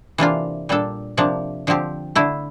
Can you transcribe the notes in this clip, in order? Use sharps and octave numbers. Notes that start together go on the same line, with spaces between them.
C3 E3 A#3 D4 F4
A#2 G3 D4 A4
C3 F3 A#3 D4
D3 F3 C4 G4
D3 A3 E4